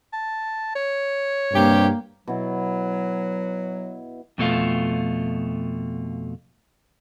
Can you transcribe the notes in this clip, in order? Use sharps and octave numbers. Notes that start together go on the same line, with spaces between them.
A5
C#5
G2 C3 A#3 G4
B2 F#3 E4
F2 B2 A3 F4